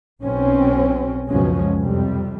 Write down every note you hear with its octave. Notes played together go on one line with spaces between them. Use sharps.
B1 B2 C4 C#4
C#2 F#2 B2 F3 G#3 C#4
F2 C3 G3